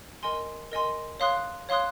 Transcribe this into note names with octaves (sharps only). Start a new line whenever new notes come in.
A#4 D#5 G#5 C6
A#4 D#5 G#5 C6
C#5 F5 C6 D#6 F#6
C#5 F5 C6 D#6 F#6